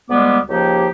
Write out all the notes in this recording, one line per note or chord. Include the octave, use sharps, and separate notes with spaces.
D2 G3 G#3 A#3 B3 D6
C#2 F3 A#3 D#4 G4